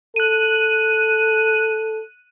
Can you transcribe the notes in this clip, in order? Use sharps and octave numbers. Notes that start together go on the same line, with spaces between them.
A4 F#6 D#7